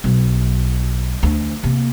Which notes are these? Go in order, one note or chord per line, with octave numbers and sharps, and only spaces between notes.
B1
D2
C3 A#3